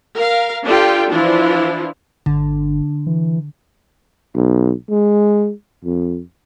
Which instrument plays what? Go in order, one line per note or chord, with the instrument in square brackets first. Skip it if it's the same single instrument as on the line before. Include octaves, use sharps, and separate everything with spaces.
[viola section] A#4 F5
D4 F4 G4 A4 G5
E3 F3 D4 E4 F4
[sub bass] G1 [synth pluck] D3
[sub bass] E3
[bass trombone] B1
G#3
F2